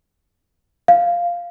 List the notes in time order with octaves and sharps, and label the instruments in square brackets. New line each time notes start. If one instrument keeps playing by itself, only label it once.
[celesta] F5